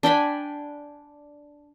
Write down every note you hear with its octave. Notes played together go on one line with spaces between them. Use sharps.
D4 G5 G#5 B5